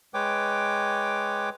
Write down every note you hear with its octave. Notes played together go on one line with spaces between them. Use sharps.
G#3 B4 C#5 G5 D6